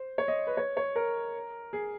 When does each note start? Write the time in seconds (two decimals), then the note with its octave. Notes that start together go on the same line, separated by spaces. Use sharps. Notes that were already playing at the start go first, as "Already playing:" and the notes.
Already playing: C5
0.18 C#5
0.28 D#5
0.47 B4
0.57 C#5
0.77 C#5
0.96 A#4
1.73 G#4